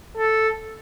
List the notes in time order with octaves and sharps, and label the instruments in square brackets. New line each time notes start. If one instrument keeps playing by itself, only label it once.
[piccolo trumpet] A4